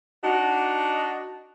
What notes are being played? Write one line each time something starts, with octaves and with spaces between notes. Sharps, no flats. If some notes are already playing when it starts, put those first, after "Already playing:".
D4 D#4 F#4